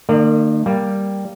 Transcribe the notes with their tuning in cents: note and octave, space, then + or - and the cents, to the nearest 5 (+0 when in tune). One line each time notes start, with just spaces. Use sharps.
D#3 -40 A#3 -35 D5 +15
G3 +0 A#3 +0